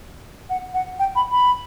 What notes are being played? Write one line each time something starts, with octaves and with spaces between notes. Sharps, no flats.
F#5
F#5
G5
B5
B5